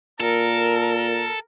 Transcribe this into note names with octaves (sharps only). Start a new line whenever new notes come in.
A#2 A4 A#4